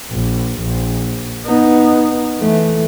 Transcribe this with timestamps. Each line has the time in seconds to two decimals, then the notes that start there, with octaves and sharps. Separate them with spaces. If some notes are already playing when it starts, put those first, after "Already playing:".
0.11 A#1
0.61 A#1
1.45 B3 D#4
2.39 E3 A3